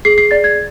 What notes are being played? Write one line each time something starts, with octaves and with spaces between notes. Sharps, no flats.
G#4 C7
C7
D5 A6
G#6